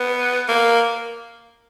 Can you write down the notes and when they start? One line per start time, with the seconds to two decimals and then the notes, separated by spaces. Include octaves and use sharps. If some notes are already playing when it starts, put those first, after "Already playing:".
Already playing: B3
0.48 A#3